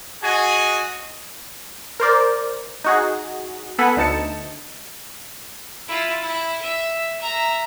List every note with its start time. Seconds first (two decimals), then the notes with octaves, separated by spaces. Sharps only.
0.23 F#4 G#4 D#5 G#5
2.00 A#4 C5 D5
2.84 D#4 F#4 G#4
3.79 B3 A4 F#5 G#5 B5
3.97 D2 D#4 A5 C#7
5.88 E4 F4
6.22 E4
6.62 E5
7.19 E5 A#5